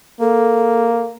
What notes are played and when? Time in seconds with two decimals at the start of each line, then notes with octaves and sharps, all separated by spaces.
0.21 A#3 A4